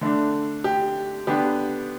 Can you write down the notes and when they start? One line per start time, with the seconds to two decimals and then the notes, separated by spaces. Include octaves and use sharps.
0.01 D3 A3 D4
0.64 G4
1.27 D3 B3 D4 G4